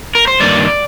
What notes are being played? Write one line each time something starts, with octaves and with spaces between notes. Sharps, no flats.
A#4
C5
G2 D#3 A#3 D5